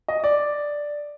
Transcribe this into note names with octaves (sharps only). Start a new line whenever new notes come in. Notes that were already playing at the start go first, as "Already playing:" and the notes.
D#5
D5